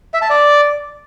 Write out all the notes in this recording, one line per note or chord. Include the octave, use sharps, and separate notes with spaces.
E5
A5
D5